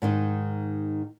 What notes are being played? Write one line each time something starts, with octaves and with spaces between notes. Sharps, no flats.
G#2 D#3 D#4